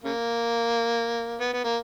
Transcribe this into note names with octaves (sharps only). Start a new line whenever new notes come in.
C#3 A#3
B3
B3
A#3